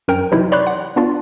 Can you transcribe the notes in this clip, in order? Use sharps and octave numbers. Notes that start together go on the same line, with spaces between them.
F#2 A#4 G5
C3 E3 F#3 D#4 E4
C#5 D5 B5 C6 F#6
F#5
B3 D4 F4